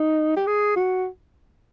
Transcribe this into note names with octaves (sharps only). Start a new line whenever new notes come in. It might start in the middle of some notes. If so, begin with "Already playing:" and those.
Already playing: D#4
G4
G#4
F#4